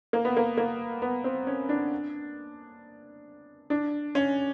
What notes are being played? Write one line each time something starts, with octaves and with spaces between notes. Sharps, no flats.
A#3
B3
A#3
A#3
B3
C4
C#4
D4
D4
C#4